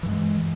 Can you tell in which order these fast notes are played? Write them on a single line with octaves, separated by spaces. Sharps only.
E3 G2 G#3